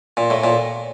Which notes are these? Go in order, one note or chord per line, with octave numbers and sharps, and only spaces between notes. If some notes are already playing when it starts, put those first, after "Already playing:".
A#2
A2
A#2